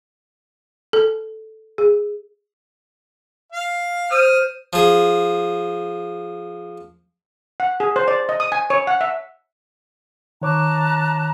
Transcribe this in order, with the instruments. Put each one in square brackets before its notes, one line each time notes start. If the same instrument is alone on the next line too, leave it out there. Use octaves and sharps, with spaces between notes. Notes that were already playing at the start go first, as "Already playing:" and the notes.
[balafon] A4
G#4
[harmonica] F5
[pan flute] C5 [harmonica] D#6 F6
[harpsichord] F3 G#4
[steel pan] F#5
G#4
C5
D5
D#5
D#6
G#5
C#5
F#5
E5
[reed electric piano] D#3 C#5 D6 [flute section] A5 A#5 F#6